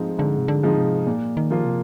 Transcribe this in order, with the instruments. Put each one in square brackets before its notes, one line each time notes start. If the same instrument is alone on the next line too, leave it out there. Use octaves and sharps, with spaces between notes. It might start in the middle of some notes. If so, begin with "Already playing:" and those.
Already playing: [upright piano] G#2 F3 G#3 C4 D#4
[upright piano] G#2 [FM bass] D3
[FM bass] C3
D3
[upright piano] F3 G#3 C4 D#4
[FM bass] C3
[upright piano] A#2
[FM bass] D#3
[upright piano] F3 A#3 F4
[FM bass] C3